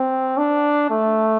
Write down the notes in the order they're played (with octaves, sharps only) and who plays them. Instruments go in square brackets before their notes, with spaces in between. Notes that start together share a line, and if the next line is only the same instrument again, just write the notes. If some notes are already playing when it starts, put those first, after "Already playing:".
Already playing: [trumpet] C4
D4
A3